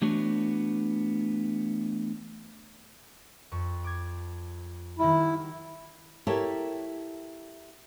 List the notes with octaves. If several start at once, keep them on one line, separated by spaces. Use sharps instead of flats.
E3 A3 B3 D4 F#4 C#5
F2 C#6
D6 G#6
D#3 F#3 G3 E4
E4 G4 A4 A#4 C#5